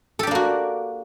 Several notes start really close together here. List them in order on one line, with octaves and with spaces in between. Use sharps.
A4 G4 D4 A#3 F#4